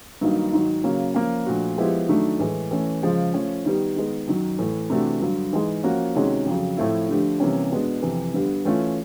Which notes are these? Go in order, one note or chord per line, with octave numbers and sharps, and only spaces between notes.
G2 D#3 F#3 A#3 D#4
G#2 D#3 F#3
C#3 F#3 A#3 C#4
F3 A#3 C#4
A#2 F3 A3 D4 F#4
F3 G#3 B3 E4 G4
D#3 F#3 A3 D4
A2 E3 G#3
E3 A3 C#4
C#3 F3 G#3
F3 A3 C#4
D#3 G3 B3
D#3 G#3 B3
F#2 D#3 F#3
A2 E3 A3
C3 E3 A3 D4 F#4
G2 D3 F#3
G#2 E3 G#3
F3 A#3 C#4 F#4
C3 D#3 G#3 C#4 F#4
F2 C#3 F#3
A2 F3 A3 C4 E4
D3 F3 A3 D4 G4
C3 E3 G3 A#3 C#4
B2 G#3 B3 D4
F2 C3 E3
G2 D3 G3 B3
E3 A3 C#4 F4